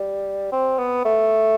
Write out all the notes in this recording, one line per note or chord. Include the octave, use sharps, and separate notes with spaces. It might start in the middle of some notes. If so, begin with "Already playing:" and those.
Already playing: G3
C4
B3
A3